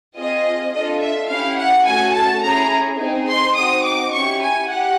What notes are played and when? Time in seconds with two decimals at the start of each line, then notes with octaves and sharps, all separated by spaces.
0.16 C4 F4 G#4 D#5
0.72 D4 F4 A4 D#5
1.01 E5
1.29 C#4 E4 G4 F5
1.58 F#5
1.85 A3 C#4 F#4 A4 G#5
2.13 A5
2.42 C#4 E4 G#4 A#5
2.98 C4 D#4 G#4
3.27 C6
3.55 C4 D#4 F#4 D#6
3.83 D6
4.12 C#4 E4 G4 C#6
4.39 G#5
4.68 G4 F#5